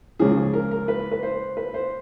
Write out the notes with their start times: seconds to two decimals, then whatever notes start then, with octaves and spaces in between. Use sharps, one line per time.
0.19 C#2 C#3 F3 G#4
0.36 G#4
0.54 A#4
0.71 A#4
0.88 B4
1.12 B4
1.23 C5
1.57 B4
1.74 C5